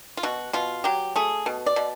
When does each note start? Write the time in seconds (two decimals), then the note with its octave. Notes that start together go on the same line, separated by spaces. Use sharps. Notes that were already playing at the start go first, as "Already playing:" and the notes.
0.17 F4
0.23 B2 F#4
0.53 B2 F4
0.84 F#3 G4
1.16 A3 G#4
1.46 B2
1.66 D5
1.76 B2